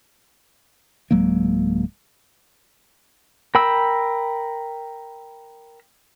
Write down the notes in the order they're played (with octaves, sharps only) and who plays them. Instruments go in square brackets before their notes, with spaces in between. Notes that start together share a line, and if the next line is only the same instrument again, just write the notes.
[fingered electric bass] D1 F#3 G#3 A#3
[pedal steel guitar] A#4 G5 B5 E6